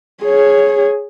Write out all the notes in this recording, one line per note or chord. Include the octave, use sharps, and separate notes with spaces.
G#4 C#5